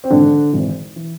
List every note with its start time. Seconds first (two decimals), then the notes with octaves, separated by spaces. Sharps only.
0.04 C4
0.10 G#1 G#2 D3 E3 D4
0.53 G#1 G#2 E3
0.96 E3